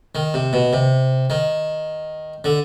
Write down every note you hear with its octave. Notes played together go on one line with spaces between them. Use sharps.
D#3
C3
B2
C3
D#3
D3